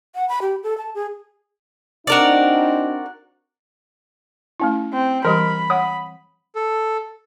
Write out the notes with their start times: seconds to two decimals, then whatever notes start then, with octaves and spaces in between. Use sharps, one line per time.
0.15 F#5
0.29 B5
0.42 G4
0.63 A4
0.78 A5
0.95 G#4
2.07 C4 D4 D#4 F#4 A#4 D5
4.60 A3 C#4 E4
4.93 C4
5.25 E3 G3 G4 A#4 B5
5.70 C#5 F#5 D#6
6.55 A4